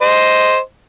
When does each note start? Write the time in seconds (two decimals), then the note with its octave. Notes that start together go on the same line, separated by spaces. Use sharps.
0.01 C5 D#5